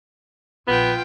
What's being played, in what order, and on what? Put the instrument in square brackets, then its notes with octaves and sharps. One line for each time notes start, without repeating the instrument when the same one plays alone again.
[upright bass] A#1 [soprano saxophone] B3 [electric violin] F4 G5